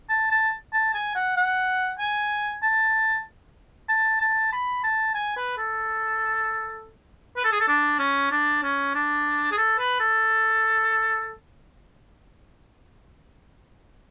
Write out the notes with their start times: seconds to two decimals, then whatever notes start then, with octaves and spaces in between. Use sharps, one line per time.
0.10 A5
0.32 A5
0.73 A5
0.94 G#5
1.15 F#5
1.37 F#5
1.99 G#5
2.63 A5
3.89 A5
4.21 A5
4.52 B5
4.84 A5
5.15 G#5
5.37 B4
5.58 A4
7.37 B4
7.44 A4
7.52 G#4
7.60 A4
7.68 D4
7.99 C#4
8.31 D4
8.63 C#4
8.94 D4
9.52 G#4
9.57 A4
9.79 B4
10.00 A4